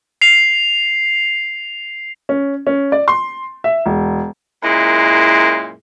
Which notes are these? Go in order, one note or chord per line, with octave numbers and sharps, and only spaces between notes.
C7 F7
C#4
C#4
D5
C6
E5
E1
F#2 A#2 G#3 E4